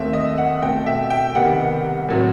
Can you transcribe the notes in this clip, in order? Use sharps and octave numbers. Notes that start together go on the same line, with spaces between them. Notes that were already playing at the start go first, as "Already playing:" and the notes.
Already playing: D#2 D#3 A3 C4 E5
D#5
F#5
B2 A3 C4 G5
E5
G5
C2 C3 D#3 G3 B3 F#5
A2 F#3 A3 C4